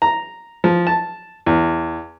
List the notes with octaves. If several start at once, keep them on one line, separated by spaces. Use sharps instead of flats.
A#5
F3
A5
E2